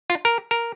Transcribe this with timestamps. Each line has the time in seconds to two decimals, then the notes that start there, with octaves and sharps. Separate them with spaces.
0.10 F4
0.25 A#4
0.51 A#4